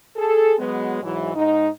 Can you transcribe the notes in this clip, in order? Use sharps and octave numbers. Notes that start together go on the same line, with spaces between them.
G#4 A4
F#3 G#3 B3
G#2 E3 F#3
G#2 D#4